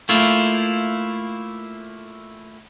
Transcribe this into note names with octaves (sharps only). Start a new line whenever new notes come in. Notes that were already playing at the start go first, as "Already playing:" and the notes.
A3 A#3 E4 F4